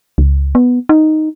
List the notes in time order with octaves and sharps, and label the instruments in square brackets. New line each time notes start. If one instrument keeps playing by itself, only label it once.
[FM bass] C#2
B3
D#4